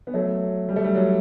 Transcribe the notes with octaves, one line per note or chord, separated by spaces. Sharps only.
B3
F#3 A3
G3
A3
G3
F#3